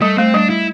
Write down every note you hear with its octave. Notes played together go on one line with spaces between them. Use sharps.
G3 A3
A3 C4
G3 D4
E4